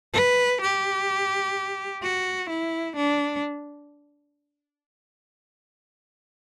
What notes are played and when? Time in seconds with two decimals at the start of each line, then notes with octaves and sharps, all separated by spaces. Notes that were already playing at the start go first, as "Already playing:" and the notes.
0.14 B4
0.62 G4
2.03 F#4
2.50 E4
2.97 D4